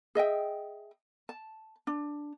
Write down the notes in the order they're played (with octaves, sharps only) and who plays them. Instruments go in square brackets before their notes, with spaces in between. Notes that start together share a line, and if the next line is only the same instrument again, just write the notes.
[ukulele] G#4 D#5 E5 G5
A5
D4